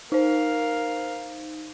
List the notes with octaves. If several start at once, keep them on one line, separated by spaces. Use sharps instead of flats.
D#4 A#4 C5 F5